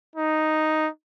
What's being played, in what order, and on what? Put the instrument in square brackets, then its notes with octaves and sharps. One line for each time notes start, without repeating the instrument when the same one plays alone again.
[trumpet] D#4